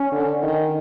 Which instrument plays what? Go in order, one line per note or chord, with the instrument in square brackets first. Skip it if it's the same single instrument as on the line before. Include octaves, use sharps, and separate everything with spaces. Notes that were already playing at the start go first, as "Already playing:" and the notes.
Already playing: [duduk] C#4
[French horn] D3
D#3